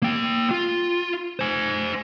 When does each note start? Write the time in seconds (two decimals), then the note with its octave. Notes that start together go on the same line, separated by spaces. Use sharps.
0.03 A#3 G5
0.51 F4
1.40 C5 G#5